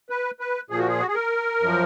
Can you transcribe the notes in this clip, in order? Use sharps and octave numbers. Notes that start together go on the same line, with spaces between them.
B4
B4
A#2 F3 G#4
F#4
G#4
F#4
G#4
A#4
F#2 F3